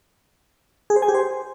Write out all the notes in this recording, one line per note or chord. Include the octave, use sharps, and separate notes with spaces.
G#4
C5
G#5
G4
C5